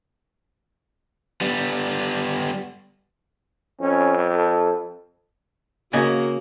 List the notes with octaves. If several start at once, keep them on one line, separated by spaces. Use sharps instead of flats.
G3 B3
F2 C#4
A4
C#3 A#3 F#4 D#5 G#5